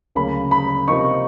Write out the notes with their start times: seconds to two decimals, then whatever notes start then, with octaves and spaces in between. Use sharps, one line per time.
0.15 D2 C#3 F#3 A#3 C#4 B5
0.51 B5
0.88 C3 F3 A#3 D#4 C#6